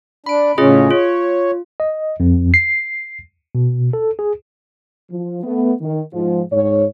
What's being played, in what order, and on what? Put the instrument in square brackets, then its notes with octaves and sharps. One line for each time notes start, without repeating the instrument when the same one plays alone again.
[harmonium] D4 [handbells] B5 D7
[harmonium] A2 C#3 C#4 [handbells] F4 G#4 D#5
[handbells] F4 [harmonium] C#5
[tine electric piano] D#5
F2
C7
B2
A4
G#4
[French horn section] F3
A3 B3
D#3
G#2 F3
G#2 C#5